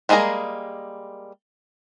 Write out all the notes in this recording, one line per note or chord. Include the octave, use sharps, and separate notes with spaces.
G3 G#3 A#3 G#4 A#4